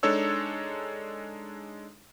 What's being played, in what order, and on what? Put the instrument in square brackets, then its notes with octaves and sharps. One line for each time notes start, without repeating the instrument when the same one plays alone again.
[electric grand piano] G#3 D4 D#4 A4 C#5 E6